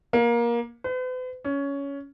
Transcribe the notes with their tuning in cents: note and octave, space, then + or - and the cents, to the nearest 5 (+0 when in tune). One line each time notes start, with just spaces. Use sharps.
A#3 +20
B4 +45
C#4 +15